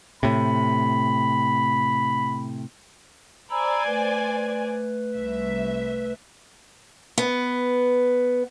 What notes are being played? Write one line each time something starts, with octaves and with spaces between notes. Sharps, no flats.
A2 C3 B5
C5 D5 G#5 A#5 B5 E6
A3 B4
C2 E5
B3